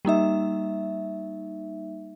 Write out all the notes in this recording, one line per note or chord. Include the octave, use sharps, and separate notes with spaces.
G3 A#3 D#4 E5